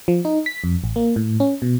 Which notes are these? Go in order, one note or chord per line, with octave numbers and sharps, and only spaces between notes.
F3
D#4
B6
F2
A1
A#3
A2
C#4
B2